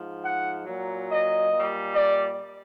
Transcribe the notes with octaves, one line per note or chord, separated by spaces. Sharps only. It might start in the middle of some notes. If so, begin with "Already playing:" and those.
Already playing: G#2 F3
F#5
A#2 F#3
D#5
A#2 G3
D5